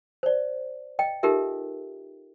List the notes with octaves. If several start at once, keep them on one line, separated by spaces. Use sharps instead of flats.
C5 D5
D#5 G5
D#4 F4 G4 A4 A#4 E5